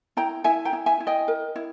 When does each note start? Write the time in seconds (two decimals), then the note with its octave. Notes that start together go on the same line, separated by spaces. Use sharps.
0.17 E4 G5 A#5
0.44 E4 E5 G#5
0.65 G5 A#5
0.73 E4
0.86 E5 G#5
1.00 E4
1.07 D#5 G5
1.28 A#4
1.56 E4